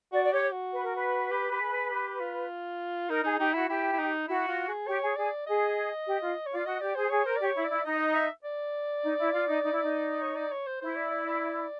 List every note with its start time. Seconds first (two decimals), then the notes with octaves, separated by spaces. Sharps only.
0.13 F#4 D5
0.23 D5
0.32 G4 C#5
0.52 F#4
0.72 B4
0.83 A#4
0.95 B4
1.31 G4
1.51 G4
1.61 G#4
1.91 G4
2.20 F4
3.09 D#4 A#4
3.24 D#4 G#4
3.39 D#4 G4
3.54 E4 F#4
3.69 E4 G4
3.93 E4
3.99 D#4
4.28 E4 F#4
4.48 F4
4.68 G#4
4.87 G4 C#5
5.02 G#4
5.17 G#4 D5
5.47 G#4 D#5
6.06 G4
6.21 F4
6.46 C#5
6.51 F4
6.56 D5
6.65 F#4 D#5
6.80 G4 D5
6.95 G#4 C5
7.10 G#4 C#5
7.25 A#4 C5
7.37 G4 D5
7.45 C#5
7.55 E4
7.65 E4 D5
7.84 D#4 D#5
7.99 D#5
8.14 E5
8.44 D5
9.03 D#4
9.18 E4
9.33 F4
9.48 D#4
9.62 D#4
9.72 E4
9.82 D#4
10.22 C#5
10.36 D5
10.52 C#5
10.66 C5
10.81 E4 C5
10.96 D5
11.10 D5
11.26 D5